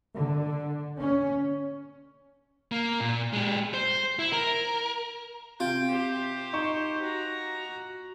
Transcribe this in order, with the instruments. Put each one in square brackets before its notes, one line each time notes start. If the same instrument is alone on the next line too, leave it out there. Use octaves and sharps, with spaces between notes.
[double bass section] D3
C#4
[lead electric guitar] A#3
A#2
G#3 G4
C5
E4
A#4
[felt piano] C3 [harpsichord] F4 [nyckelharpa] G5
[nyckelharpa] G4 C5
[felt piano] D#4 C#6 E7
[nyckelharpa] F#4 A#5